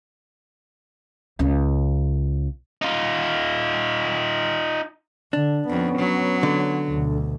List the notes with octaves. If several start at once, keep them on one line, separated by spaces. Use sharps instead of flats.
C#2 C#3
D#4 F4
D3 D4
F2 B3 C#4
F#3
D3
D2 B2